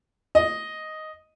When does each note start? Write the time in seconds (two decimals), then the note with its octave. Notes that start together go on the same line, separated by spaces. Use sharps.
0.35 D#5